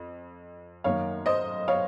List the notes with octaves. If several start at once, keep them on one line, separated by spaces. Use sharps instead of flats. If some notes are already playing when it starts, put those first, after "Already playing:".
Already playing: F2
F#2 D#3 A#3 C#5 F5
C5 D#5
C#5 F5